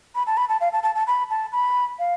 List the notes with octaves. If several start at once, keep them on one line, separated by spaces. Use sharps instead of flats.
B5
A5
B5
A5
F5
A5
A5
A5
B5
A5
B5
F5